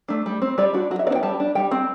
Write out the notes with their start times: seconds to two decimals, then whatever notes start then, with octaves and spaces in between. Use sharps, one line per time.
0.08 A3 D4
0.26 G3
0.42 C4
0.58 G3 D5
0.74 D4 F#4
0.91 F#3 F#4
0.99 E5
1.07 B3 D5
1.10 D4
1.15 G5
1.23 G3 A5
1.40 D4
1.55 G3 G5
1.71 C4